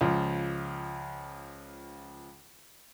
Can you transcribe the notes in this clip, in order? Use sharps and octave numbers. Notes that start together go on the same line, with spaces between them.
C#2 F3